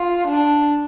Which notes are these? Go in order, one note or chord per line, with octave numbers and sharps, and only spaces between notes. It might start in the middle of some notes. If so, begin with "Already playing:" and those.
Already playing: F4
D4